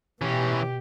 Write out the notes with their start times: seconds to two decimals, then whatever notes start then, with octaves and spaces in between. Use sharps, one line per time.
0.22 B2 E3 C#4 G4